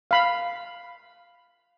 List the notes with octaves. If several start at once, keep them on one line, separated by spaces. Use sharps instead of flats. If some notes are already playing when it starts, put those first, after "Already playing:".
F5 B5